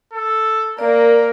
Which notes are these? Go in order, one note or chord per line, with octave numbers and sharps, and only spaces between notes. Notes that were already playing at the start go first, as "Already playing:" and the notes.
A4
A#3 A#4 D5